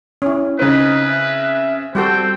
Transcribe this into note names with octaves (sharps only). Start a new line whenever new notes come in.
C#4 E4
C#3 C4 D#4 B4
E5
G3 C4 F#4 A4 G5